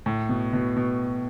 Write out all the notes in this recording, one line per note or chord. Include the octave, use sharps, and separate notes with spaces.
A2
B2
B2
B2